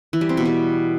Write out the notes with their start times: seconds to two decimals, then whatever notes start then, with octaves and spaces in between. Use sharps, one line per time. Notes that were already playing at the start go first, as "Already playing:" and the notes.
0.13 E3
0.21 G3
0.29 C4
0.37 B2
0.45 G3